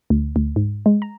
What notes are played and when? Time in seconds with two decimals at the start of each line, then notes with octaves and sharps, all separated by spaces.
0.10 D2
0.36 D2
0.56 G#2
0.86 G#3
1.02 A#5